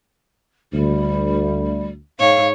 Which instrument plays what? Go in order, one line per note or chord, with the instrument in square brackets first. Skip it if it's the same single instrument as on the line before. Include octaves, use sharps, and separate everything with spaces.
[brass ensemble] D2 [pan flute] G3
[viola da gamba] G#2 C#5 [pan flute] F5